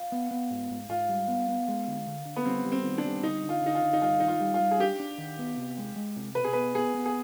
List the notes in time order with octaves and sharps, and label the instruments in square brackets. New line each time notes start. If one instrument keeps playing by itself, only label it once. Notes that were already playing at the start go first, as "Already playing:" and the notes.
Already playing: [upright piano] F4
[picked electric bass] B3
B3
G#2
G#2
[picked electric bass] G#2 [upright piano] F4
[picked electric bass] G3
B3
B3
G#3
D3
D3
D3
[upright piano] B3
[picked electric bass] G3 [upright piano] C4
[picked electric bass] G3
[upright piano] C4
[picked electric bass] D#3
[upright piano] D4
[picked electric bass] G3
[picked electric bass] D3 [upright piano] D#4
[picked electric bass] D3
[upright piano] F4
[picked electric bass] D3 [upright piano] D#4
[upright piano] F4
[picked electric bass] D3
[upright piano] D#4
[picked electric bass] G2 [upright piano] F4
[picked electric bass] D#3 [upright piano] D#4
[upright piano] F4
[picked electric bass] G3
[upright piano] F4
[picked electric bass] G3
[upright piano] G#4
[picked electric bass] D4 [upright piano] G4
[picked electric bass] D4
D#3
B3
C3
G#3
G#3
C3
[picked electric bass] B2 [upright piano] B4
[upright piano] G#4
[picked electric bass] B3 [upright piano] B4
[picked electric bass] B3 [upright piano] G#4
[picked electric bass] B3
[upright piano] G#4